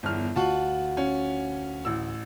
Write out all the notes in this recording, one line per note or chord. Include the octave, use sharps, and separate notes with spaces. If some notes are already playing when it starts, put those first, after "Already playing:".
G1 E2 F6
D2 F4 F#4 A5 F#7
C#4
A1 E6